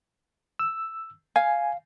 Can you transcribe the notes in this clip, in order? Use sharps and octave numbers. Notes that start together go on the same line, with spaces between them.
E6
F5 G#5